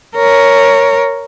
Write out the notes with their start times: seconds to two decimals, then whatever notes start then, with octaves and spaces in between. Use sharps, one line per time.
0.16 A#4 C#5